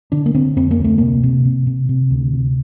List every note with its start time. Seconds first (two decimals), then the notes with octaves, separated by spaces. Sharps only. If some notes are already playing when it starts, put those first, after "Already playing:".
0.12 D3 D4
0.26 A#3
0.34 D3 C4
0.56 F2 C4
0.71 A#3
0.79 D2
0.84 A3
0.98 C3 A#3
1.23 C3
1.45 C3
1.67 C3
1.89 C3
2.11 D2
2.33 C3